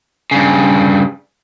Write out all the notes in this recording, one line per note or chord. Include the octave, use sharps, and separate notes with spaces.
G2 C#3